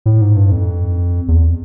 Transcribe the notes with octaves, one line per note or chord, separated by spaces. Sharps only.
A2
G#2
G2
F2
E2